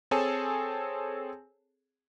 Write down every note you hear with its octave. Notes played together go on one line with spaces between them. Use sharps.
C4 G#4 A4 C#5 G#5 A5